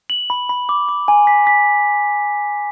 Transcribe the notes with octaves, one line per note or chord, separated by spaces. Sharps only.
F#7
B5
B5
D6
D6
G#5
B6
B6